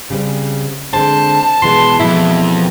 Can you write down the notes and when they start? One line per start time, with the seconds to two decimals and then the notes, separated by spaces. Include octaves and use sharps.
0.10 C#3 G3 C4
0.94 D3 G#3 C4 C5 A5
1.62 B2 E3 G#3 C6
1.99 F2 G#2 E4